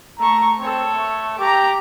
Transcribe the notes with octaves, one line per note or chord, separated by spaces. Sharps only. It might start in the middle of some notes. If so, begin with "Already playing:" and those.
A3 A#5 C#6
C4 A4 C#5
A3
G4 A#5 D6